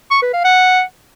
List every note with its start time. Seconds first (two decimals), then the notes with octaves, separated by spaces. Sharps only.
0.11 C#6
0.22 B4
0.33 F5
0.45 F#5